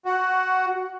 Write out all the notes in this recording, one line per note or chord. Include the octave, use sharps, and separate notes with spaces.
F#4